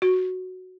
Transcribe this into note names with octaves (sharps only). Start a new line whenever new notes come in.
F#4